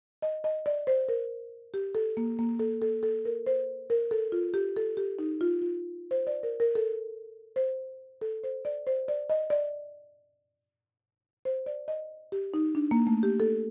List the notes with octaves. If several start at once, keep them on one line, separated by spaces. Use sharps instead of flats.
D#5
D#5
D5
C5
A#4
G4
A4
A#3
A#3
A4
A4
A4
A#4
C5
A#4
A4
F4
G4
A4
G4
D#4
F4
F4
C5
D5
A#4
A#4
A4
C5
A4
C5
D5
C5
D5
D#5
D5
C5
D5
D#5
G4
D#4
D4
A#3
A3
G4
A4